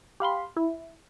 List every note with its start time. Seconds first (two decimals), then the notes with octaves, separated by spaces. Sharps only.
0.20 G4 F5 B5 C6
0.56 E4